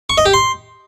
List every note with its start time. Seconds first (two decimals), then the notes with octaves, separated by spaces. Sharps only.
0.10 C#6
0.18 D#5
0.26 G4
0.34 C6